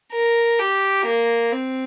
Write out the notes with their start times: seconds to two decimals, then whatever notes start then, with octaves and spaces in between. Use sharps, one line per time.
0.12 A#4
0.59 G4
1.06 A#3
1.52 C4